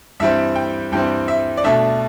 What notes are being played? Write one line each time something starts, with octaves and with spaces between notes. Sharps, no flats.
G2 E3 G3 C4 E5
G5
G2 E3 G3 C4 G5
E5
D5
B2 A3 D4 E5